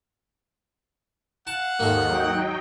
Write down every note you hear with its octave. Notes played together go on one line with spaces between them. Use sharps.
F5 F#5 A5
D#2 G#2 D#3 A#3 A4
F#3 D#4 G5